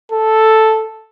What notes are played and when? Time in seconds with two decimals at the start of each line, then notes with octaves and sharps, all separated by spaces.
0.12 A4